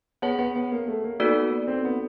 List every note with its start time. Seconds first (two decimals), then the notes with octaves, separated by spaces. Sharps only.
0.22 B3 G#4 C#5 F#5 A5
0.39 B3
0.56 B3
0.72 A#3
0.88 A3
1.04 A#3
1.20 A#3 B3 D#4 F#4 A4 D5
1.67 C4
1.85 B3